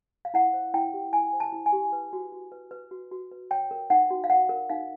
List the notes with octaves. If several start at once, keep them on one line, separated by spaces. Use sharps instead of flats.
F5
E4 F#5
C5
E4 G5
G4
E4 G#5
C5
A5
E4
G#5
G4
B4
F#4
F#4
B4
B4
F#4
F#4
B4
C#5 G5
A#4
D#4 F#5
F#4
F5
C#5 F#5
A#4
D#4 F5